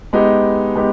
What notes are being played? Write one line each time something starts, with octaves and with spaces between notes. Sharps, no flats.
G#3 B3 D#4 G4
G#3 B3 D#4 G4